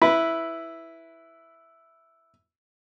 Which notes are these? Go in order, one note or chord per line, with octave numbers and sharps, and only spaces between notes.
E4 B4